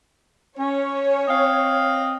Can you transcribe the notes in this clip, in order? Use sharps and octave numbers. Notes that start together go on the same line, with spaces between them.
C#4 C#5
C4 D#5 F5